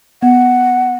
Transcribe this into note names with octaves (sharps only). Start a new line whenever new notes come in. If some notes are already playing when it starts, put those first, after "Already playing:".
B3 F#5